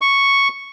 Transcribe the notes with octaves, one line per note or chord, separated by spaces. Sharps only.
C#6